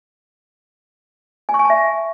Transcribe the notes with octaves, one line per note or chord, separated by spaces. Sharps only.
G#5
C#6
G#5
A5
E5